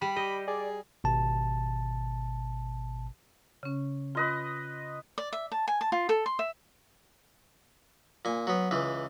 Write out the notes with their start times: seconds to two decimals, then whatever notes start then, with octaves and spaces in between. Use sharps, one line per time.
0.02 G3 B5
0.16 G4 D#5
0.48 G#4 D5
1.04 G#1 B2 A5
3.63 C#3 C#4
4.15 F4 B4 D#5 C6
5.18 D5
5.33 E5
5.52 A5
5.68 G#5
5.81 A5
5.92 F4
6.09 A4
6.26 C6
6.39 E5
8.25 A#2 G#5
8.47 F#3 B3
8.71 C#2 E3